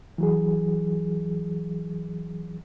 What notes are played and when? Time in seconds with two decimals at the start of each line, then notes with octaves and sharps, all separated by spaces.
0.18 E3 F#3 G#4